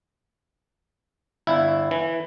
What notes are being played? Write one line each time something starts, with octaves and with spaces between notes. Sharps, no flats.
G1 E4
E3